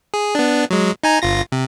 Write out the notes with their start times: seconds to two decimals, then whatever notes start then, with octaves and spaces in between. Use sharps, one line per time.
0.14 G#4
0.35 B3 D4
0.70 F#3 G#3
1.04 D#4 G#5 A#5
1.22 G1 F4 A#6
1.52 C3